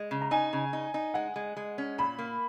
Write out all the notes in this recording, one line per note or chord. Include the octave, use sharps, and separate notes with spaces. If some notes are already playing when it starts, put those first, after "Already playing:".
Already playing: G#3
C#3
A#5
D#4 G#5
C#3
D#4
D#4
G#3 F#5
G#3
G#3
C#4
A#2 B5
A#3